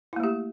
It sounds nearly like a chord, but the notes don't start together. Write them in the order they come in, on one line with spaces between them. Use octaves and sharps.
E4 A#3 A3 G4